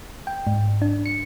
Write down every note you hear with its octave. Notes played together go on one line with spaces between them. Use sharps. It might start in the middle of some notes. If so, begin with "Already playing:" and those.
G5
G#2
D4
C#7